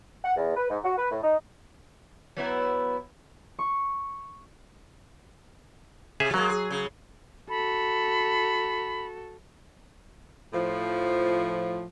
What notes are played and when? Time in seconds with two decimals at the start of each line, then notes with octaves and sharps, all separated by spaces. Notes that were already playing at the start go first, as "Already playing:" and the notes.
0.23 F#5
0.37 E2
0.56 B4
0.69 G#2
0.83 F#4
0.97 B4
1.12 A2
1.24 D#4
2.37 F#3 B3 E4
3.59 C#6
6.20 C3 G#4 E5
6.34 F#3 G#3 A#3
6.49 G#4
6.70 C#3
7.50 F#4 A4 B5
10.53 A2 F3